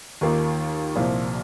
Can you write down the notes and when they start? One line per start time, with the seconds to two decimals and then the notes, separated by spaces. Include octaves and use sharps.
0.21 D#2 D#3 A#3 F4
0.96 C2 A#2 F3